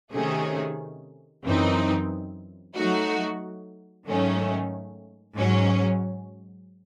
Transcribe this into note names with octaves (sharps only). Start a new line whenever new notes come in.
C3 D#3 A3 C#4 G#4
F#2 E3 C4 D#4
F#3 A3 D#4 F#4
G#2 D#3 F#3 A3 C#4
G#2 F#3 C#4